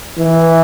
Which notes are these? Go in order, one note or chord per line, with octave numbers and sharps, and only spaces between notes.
E3